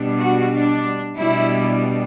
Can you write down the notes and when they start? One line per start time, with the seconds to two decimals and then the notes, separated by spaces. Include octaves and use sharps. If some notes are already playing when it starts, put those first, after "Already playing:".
Already playing: B2 G3 D4
0.21 F#4
0.53 D4
1.18 B2 G3 D4 E4